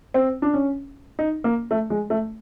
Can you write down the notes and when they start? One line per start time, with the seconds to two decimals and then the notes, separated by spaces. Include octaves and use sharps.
0.14 C4
0.42 D4
0.54 C#4
1.19 D#4
1.44 A#3
1.71 A3
1.90 G#3
2.10 A3